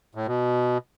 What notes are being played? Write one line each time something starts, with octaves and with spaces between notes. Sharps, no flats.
A2
B2